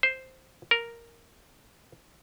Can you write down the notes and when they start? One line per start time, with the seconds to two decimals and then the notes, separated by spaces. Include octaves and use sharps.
0.03 C5
0.71 A#4